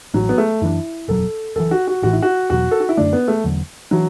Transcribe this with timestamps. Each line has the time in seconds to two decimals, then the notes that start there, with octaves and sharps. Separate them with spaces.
0.14 A1 A2 E3 F#3
0.29 B3
0.38 A3
0.62 F#2 E3 D4 E4
1.08 F#1 E2 B2 F#3 A4
1.56 F#1 F#2 E3 A4
1.71 F#4
1.88 F#4
2.02 A1 A2 E3 F#4
2.13 E4
2.22 F#4
2.50 E2 B2 F#3 F#4
2.71 A4
2.80 F#4
2.89 E4
2.97 F#2 D3 A3 D4
3.13 B3
3.28 A3
3.44 E1 E2 D3 F#3
3.91 E3 F#3 D4